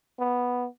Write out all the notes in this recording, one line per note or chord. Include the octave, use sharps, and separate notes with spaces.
B3